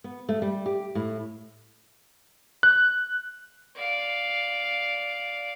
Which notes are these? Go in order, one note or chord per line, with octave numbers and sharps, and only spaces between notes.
B3
A3
G3
G4
A2
F#6
D5 F5